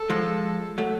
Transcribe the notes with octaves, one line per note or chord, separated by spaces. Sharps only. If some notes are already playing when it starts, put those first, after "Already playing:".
Already playing: A4
F3 G#3
F#3 A3